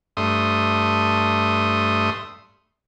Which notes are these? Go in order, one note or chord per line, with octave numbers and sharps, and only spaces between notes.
G2 A3 C6 D#6